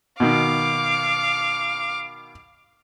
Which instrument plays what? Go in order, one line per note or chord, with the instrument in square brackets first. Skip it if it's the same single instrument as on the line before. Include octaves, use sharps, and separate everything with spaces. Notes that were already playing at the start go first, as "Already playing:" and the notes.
[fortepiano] B2 D#3 [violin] F5 D6